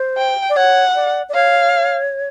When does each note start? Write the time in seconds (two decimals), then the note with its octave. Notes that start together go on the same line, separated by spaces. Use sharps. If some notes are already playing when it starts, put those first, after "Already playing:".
Already playing: C5
0.18 G5
0.50 D5
0.57 C#5 F#5
0.95 D5
1.29 D5
1.34 C#5 F5